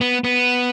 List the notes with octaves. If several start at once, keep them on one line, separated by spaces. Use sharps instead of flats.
B3
B3